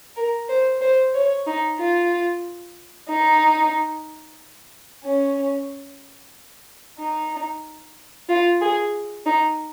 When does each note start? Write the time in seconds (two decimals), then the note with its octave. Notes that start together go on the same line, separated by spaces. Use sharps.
0.16 A#4
0.49 C5
0.81 C5
1.14 C#5
1.47 D#4
1.79 F4
3.09 D#4
5.04 C#4
6.99 D#4
8.29 F4
8.61 G#4
9.26 D#4